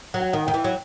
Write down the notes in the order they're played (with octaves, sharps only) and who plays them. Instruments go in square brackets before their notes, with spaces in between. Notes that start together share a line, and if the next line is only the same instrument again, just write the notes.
[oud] F#3
[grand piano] F#5
[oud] D#3
[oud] D#3 [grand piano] G5
[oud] E3
F#3